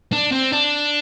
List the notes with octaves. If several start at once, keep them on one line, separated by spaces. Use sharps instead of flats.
D4
C4
D4